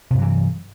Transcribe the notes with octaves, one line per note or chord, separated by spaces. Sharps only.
G2 C3 E3 F#3